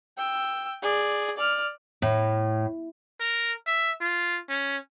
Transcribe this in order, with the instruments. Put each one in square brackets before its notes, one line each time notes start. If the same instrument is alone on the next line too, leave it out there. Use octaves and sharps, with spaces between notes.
[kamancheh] G5 E6
G#4 D5
D5 F6
[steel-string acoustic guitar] A2
[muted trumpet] A#4
E5
F4
C#4